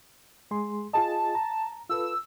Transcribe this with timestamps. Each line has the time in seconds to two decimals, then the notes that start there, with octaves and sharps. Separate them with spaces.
0.51 G#3 G#4 C6
0.93 F4 G#4 D#5 A5
1.35 A#5
1.90 F4 A4 B4 E6